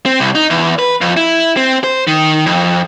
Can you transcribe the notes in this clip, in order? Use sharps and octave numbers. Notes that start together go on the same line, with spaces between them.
C4
C2
D#4
E2
B4
F2
E4
C4
C5
D#3
F2